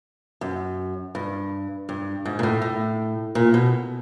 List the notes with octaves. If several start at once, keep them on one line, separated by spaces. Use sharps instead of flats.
F#2
G2
G2
G#2
A#2
A2
A2
A#2
B2